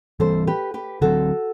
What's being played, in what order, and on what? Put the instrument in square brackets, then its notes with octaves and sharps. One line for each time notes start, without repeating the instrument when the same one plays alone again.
[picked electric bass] E3 G3 C4 [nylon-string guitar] A4 C5
[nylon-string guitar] G4 B4
G4 B4
[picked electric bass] D3 F#3 C4 [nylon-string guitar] F#4 A4